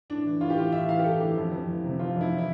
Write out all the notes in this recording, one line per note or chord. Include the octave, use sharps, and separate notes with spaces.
A2 D4
E3
A2 F4
G4
E3 F4
A2 E5
E3 F5
G4
A2 A4
E3 G4
F2
F2
E3
C3
F2 F4
F2 E4
E3
E4